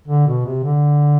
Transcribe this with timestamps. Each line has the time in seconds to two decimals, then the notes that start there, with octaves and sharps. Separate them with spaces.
0.08 D3
0.27 B2
0.45 C3
0.63 D3